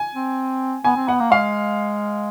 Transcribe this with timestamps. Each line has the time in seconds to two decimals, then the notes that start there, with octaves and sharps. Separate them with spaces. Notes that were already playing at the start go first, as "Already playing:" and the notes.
Already playing: G#5
0.14 C4
0.84 B3 G#5
0.96 C4
1.08 B3 F#5
1.20 A#3
1.32 G#3 F5